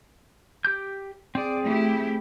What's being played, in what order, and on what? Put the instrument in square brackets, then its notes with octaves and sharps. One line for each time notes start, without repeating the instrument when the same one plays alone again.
[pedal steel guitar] G4 D6 G6
[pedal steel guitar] C4 G#4 [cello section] D5
[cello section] A3 E4 G4